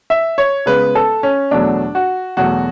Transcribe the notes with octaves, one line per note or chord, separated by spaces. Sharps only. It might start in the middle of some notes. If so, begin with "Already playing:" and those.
E5
C#5
C#3 G#3 B3 B4
A4
C#4
E2 B2 F#3 A3 D4
F#4
E2 B2 F#3 A3 F#4